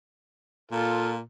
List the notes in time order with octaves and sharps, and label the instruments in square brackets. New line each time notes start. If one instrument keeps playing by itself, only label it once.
[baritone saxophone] A#2 [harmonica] F4 A4